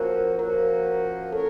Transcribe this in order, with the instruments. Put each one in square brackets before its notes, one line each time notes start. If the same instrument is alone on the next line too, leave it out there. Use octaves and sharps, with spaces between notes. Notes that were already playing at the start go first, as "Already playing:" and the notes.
Already playing: [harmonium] F3 A#3 C#4 F#4 [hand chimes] A#4
[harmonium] F3 A#3 C#4 F#4 [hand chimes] A#4
[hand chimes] A4 [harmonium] A#4 C#5